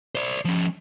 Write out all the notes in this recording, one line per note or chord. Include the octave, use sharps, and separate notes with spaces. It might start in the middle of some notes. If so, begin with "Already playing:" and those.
C5 D5
F3 C#4